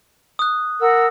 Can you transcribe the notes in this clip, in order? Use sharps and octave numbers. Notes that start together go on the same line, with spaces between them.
D#6 F#6
A#4 F#5 E6